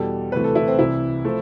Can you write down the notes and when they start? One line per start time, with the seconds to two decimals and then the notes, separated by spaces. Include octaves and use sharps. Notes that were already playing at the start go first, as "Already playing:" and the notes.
Already playing: E2 B2 G3 A4
0.32 D2 C3 E3 A3 B4
0.44 A4
0.55 E4
0.68 C4
0.79 C2 C3 E3 E4
1.25 F3 A3